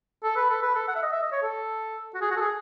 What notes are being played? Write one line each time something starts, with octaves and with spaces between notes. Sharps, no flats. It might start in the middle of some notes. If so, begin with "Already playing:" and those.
A4
B4
A4
B4
A4
F#5
E5
D#5
E5
D#5
C#5
A4
F#4
G#4
F#4
A4
G#4